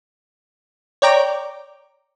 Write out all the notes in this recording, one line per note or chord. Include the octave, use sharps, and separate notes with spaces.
C#5 D5 G5 A#5 D6